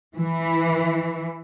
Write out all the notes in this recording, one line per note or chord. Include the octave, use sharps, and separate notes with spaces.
E3